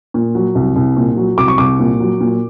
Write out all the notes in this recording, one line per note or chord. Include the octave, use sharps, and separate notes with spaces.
A#2
F#3
C2
C2
A#2
F#3
C2 D6
C#6
C2 D6
A#2
F#3
A#2